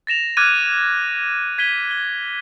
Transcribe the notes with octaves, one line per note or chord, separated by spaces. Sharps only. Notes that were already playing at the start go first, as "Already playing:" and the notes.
A6 A#6 E7 F7
D6 F6 F#6 G#6 A6 D#7
G#6 B6 D#7 G7
G7